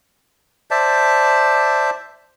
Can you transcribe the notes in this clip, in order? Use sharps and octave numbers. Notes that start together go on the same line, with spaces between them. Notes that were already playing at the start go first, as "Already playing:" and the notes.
C5 D5 E5 A5